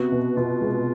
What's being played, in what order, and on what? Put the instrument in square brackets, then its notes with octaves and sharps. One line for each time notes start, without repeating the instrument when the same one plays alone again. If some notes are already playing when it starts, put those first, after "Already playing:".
Already playing: [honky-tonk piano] C3 B3 [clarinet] F#4
[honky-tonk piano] B2
[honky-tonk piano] B2 [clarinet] F4
[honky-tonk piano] G#3